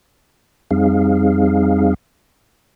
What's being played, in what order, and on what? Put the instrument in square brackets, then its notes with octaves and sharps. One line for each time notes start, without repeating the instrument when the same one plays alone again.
[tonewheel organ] F2 G3 C4 D#4 G#4 F5